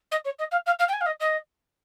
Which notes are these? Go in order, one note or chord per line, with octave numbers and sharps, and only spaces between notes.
D#5
C#5
D#5
F5
F5
F5
G5
G#5
F5
D#5
D#5